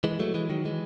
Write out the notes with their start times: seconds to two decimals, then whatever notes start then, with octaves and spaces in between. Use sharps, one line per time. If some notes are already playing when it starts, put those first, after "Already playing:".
0.04 E3 G#3
0.20 F#3 A3
0.34 E3 G#3
0.50 D#3 F#3
0.65 E3 G#3